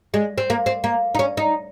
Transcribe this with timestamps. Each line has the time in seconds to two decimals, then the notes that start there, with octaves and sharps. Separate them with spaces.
0.14 G#3
0.38 C4
0.50 A#3
0.66 C4
0.84 A#3
1.15 D#4
1.19 C#4
1.37 D#4